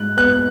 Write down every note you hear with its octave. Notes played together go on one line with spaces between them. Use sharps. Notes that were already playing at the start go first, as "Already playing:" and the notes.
Already playing: G#2 F#6
B3 F#6